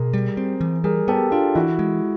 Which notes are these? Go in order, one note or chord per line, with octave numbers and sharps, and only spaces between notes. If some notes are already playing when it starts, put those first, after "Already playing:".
Already playing: B2 G#4 A#4
G3
C4
E3
G3 G#4 A#4
B3 G4 A4
D4 F4 G4
E3 E4 F#4
G#3